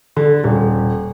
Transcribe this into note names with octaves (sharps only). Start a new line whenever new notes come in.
D3
D#1